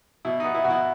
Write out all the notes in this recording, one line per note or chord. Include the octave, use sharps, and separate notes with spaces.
B2 E4
B3 D#4
E4
B2 F#4
E4